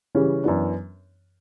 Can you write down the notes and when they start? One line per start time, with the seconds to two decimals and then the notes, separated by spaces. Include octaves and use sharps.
0.15 C#3 E3 G3 C#4
0.44 F#2 E3 B3 D4